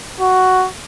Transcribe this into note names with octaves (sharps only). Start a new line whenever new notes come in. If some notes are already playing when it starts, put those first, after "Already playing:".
F#4